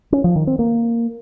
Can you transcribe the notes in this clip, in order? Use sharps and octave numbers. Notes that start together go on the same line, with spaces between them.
C#4
F3
D#3
C4
A#3